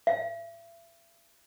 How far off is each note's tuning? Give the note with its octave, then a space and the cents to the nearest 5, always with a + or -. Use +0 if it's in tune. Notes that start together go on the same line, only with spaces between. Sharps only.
E5 +40